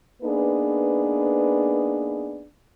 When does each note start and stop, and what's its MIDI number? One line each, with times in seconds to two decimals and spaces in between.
0.23 2.45 58
0.23 2.45 59
0.23 2.45 62
0.23 2.45 63
0.23 2.45 68
0.23 2.45 71